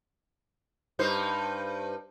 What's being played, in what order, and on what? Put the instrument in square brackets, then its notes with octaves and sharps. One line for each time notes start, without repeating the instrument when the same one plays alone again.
[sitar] G2 D#4 C5